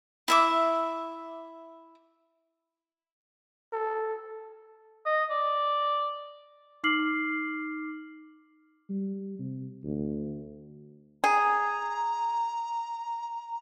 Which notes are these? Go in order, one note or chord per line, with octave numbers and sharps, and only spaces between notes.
E4 E5 D6
A4
D#5
D5
D#4 D6 F6 C7 F#7
G3
C3
D2
G#4 A#5